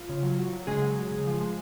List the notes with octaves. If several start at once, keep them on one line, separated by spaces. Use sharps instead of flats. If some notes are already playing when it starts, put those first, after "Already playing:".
Already playing: F4
C#3
F#3
F#3
F#3
C#3 G#3 G#4
F#3
F#3
C#3
F3
G#3